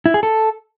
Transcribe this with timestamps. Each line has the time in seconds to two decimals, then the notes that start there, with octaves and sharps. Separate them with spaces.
0.06 E4
0.14 G#4
0.23 A4